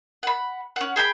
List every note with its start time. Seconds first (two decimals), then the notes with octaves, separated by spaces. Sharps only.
0.23 F#5 B5
0.76 C#4 F#5
0.96 G#4 G5 A#5 B5